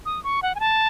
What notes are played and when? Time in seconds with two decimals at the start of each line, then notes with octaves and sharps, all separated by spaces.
0.06 D#6
0.24 C#6
0.43 F#5
0.55 G#5
0.60 A5